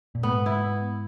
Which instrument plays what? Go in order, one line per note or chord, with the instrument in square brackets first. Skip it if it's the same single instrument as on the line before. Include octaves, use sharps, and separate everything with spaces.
[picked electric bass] A#2
[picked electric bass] G#2 [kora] B3
[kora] E4